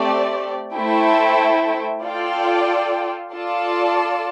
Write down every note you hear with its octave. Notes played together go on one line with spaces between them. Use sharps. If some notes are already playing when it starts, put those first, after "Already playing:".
Already playing: A3 C4 G4 D5
A3 E4 A4 C5 G5
F4 A4 D5 G5
F4 A4 D5 A5